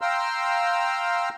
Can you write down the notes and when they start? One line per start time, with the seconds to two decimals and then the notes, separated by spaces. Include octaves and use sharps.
0.01 F5 G5 A#5 C6 E6 F6